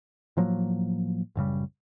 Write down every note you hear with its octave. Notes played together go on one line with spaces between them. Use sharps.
A2 F3 F#3 A#3
A1 F#2 C#3 G3